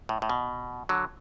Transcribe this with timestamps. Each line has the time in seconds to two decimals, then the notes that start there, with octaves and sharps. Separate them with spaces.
0.09 A2
0.22 A2
0.30 B2
0.89 D3 F#3